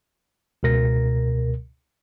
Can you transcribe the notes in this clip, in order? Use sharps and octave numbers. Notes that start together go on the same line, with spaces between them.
C#2 B2 A#4 A#6